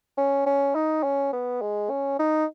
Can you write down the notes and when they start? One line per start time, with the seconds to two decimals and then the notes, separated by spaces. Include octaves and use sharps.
0.18 C#4
0.46 C#4
0.75 D#4
1.03 C#4
1.33 B3
1.62 G#3
1.90 C#4
2.19 D#4